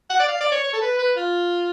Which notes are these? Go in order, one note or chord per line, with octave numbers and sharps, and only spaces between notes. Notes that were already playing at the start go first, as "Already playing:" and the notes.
F#5
D5
F5
D5
C#5
C#5
A4
B4
B4
F4